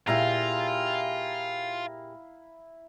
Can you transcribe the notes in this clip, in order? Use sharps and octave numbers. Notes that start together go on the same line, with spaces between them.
A#2 E4 F4 G4 G#4 F5 A#5